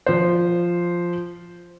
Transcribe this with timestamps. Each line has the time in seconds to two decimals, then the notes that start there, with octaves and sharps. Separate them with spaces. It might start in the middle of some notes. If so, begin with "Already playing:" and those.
0.06 F3 C5